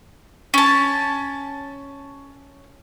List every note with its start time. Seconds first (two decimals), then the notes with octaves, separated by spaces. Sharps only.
0.54 C#4 A5